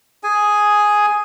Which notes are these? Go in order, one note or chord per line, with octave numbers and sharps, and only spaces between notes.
G#4 G#5